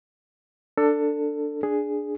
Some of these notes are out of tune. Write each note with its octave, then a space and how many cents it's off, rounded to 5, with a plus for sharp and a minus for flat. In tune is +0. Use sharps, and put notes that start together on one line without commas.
D4 +0 A4 +20
D4 +0 G#4 +0